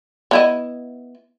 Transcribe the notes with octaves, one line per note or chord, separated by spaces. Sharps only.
B3 E4 D#5